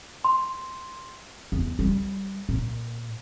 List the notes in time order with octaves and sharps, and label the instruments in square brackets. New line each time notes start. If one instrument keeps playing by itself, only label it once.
[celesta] C6
[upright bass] E2
G3
A#2